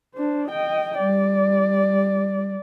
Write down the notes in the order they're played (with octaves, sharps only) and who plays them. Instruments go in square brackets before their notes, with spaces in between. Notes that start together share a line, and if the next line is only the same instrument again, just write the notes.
[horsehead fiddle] D4 C5
D#5 G5
[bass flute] G3 [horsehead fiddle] D5